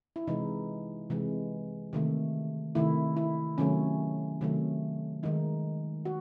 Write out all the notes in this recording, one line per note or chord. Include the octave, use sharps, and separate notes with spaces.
E4
C3 E3 G#3 D#4
C3 E3 G#3
C3 D#3 A3
C3 D#3 A3 E4
E4
C3 D#3 F#3 A3 C#4
C3 D#3 F#3 A3
D#3 G#3 D#4
F#4